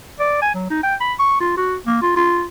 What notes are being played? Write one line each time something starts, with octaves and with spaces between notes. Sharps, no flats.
D5
G#5
F#3
D#4
G5
B5
C#6
F4
F#4
A#3
F4
F4